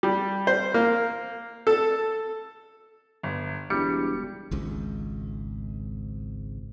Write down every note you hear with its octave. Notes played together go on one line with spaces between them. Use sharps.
G3
C5
A#3
A4
G1
E1 G3 C#7
G#1 C#2 G#2